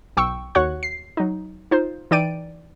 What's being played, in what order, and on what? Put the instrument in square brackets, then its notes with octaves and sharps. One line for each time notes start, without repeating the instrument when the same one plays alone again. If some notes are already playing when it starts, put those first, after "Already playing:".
[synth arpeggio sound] B1 G5 C#6 E6
D#2 F#4 C#5 F#5 C#6 F#6
C7
F#3 D#4
D#4 F4 C5
E3 D#4 D5 G5 D7 D#7